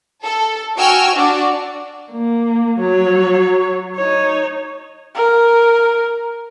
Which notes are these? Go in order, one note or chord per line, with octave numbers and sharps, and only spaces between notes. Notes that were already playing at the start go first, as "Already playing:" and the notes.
A4
F#4 G5 G#5 E6 F6
D4 F#4 D5
A#3
F#3 C#5
D#4 C#5
A#4